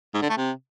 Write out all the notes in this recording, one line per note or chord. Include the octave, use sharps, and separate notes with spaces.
G#2
D3
A3
C3